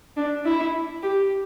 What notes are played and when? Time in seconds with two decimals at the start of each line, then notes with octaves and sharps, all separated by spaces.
0.17 D4
0.45 E4
1.03 G4